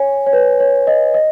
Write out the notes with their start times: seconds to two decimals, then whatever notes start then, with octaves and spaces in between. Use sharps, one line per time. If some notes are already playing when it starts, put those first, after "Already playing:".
Already playing: C#5 G#5
0.26 C#5
0.33 B4
0.60 C#5
0.87 D#5
1.14 D#5